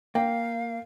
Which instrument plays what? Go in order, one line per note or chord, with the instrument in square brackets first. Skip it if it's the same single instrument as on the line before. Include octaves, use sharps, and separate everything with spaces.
[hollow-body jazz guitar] A#3 [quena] F5 [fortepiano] G5